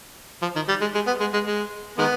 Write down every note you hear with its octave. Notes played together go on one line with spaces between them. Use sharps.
F3
D#3
G3
G#3
G#3
B3
G#3
G#3
G#3
D#3 G#3 B3